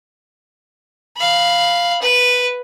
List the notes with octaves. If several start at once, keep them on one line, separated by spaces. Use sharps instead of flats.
F5 B5
B4